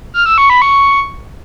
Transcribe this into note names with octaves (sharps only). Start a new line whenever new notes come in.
F6
E6
C#6
B5
C#6